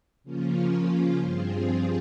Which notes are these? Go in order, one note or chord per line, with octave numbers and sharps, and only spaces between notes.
C#3 F3 A#3 C#4 F4
G2 F3 C4 F4 G#4